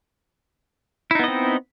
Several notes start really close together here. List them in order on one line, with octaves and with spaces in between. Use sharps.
E4 D#4 B3 D#5 C4